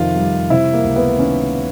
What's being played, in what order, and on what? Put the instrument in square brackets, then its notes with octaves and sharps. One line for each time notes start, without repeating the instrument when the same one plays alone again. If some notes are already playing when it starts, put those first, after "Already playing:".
Already playing: [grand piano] F2 C3 D#3 F4
G3
C3 E4
A#3
C#2
B3
D#3 C#4